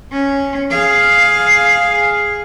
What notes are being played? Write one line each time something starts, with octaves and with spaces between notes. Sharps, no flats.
C#4
G#4 F5